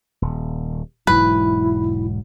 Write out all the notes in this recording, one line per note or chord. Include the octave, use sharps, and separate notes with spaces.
D#1
E1 G#2 F#3 E4 B4